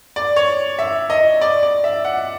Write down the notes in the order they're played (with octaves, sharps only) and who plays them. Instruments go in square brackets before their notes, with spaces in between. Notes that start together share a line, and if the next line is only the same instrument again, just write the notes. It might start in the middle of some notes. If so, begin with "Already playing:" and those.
[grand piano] D5
C#5
E5
D#5
D5
D5
E5
F#5